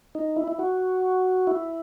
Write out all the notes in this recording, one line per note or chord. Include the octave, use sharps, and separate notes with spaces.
D#4
E4
E4
F#4
E4